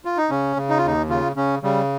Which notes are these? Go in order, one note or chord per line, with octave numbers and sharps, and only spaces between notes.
F4
D#4
C#3 C#4
C#3
D#4
F4
D#2 D#4
C#3 F4
C#3 C#4
C#3 G3